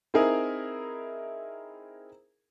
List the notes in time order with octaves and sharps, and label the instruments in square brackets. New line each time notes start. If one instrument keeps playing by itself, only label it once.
[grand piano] C4 D#4 E4 G#4 A#4